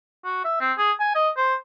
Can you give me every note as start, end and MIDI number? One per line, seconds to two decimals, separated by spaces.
0.25 0.40 66
0.44 0.58 76
0.60 0.73 60
0.78 0.91 68
1.00 1.10 80
1.15 1.29 75
1.37 1.55 72